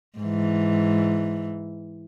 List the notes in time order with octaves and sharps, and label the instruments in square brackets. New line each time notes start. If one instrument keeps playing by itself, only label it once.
[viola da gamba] G#2 E3